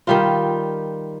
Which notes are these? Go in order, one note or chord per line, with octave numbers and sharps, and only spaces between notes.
D#3 G3 F4